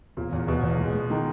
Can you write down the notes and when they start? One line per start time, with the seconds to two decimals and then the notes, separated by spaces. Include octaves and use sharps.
0.17 E1 A#2
0.32 E2
0.48 E1 B2
0.63 E2
0.79 G#3
0.94 G#3
1.10 D#3 G#3